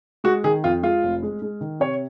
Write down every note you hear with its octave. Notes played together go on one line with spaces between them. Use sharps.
G#3 F#4
D#3 G#4
F2 F4
G#3 F4
F1
G#3
G#3
D#3
C3 C#5